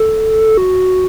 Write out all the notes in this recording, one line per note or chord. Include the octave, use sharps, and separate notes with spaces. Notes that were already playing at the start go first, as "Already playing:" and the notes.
Already playing: A4
F#4